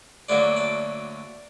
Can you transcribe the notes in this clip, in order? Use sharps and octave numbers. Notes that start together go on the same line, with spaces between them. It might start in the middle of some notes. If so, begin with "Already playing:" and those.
D2 D3 F#3 A#3 D5
D5